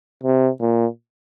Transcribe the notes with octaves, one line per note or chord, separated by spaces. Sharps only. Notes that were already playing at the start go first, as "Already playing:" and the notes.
C3
A#2